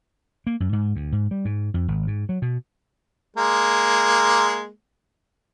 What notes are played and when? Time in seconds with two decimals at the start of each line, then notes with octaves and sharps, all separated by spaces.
0.47 A#3
0.60 F#2
0.73 G#2
0.96 D2
1.12 G#2
1.31 G3
1.45 G#2
1.74 F2
1.88 G#1
2.07 G#2
2.29 F#3
2.42 B2
3.37 G#3 A#3